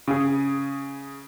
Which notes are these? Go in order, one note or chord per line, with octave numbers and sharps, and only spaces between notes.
C#3 G#4